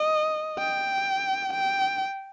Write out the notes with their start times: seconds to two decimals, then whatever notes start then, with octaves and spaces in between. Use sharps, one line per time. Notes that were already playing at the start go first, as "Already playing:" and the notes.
Already playing: D#5
0.59 G5
1.53 G5